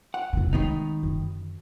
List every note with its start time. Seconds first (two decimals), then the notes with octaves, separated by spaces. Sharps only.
0.14 F#5
0.33 F1 C#3
0.53 D#3 G#3 A3 B3 D#4
1.03 F#2 D3